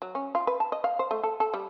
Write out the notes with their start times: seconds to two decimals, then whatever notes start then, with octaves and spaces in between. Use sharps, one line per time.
0.02 F#3
0.15 C#4
0.35 F4
0.47 B4
0.60 A5
0.72 D#5
0.84 F5
0.99 C5
1.11 A3
1.23 A4
1.40 A4
1.54 G3